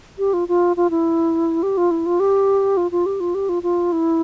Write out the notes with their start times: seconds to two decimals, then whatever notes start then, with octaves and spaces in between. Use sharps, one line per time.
0.18 G4
0.34 F4
0.48 F4
0.77 F4
0.90 E4
1.63 G4
1.77 F4
1.91 E4
2.06 F4
2.20 G4
2.77 F4
2.92 F4
3.06 G4
3.20 F4
3.35 G4
3.49 F4
3.63 F4
3.92 E4